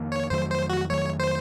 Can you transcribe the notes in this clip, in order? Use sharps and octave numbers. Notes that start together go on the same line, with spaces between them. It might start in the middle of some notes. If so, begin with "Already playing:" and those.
Already playing: F2 D#3 A#3
C#5
F2 D#3 F#3 A3 C5
C5
F#4
F2 D#3 F#3 A3 C#5
C5